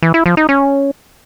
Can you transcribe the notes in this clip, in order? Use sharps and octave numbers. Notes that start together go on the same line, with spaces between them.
E3
E4
F3
D#4
C#4